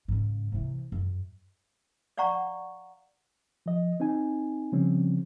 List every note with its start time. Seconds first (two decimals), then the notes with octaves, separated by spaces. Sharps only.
0.08 G#2 C#3
0.52 C3 E3
0.92 F#2
2.17 D5 F5 F#5 A#5 C#6
3.66 F3 D#5
4.00 C4 D#4 G#5
4.72 C#3 F3 G3 C4 C#4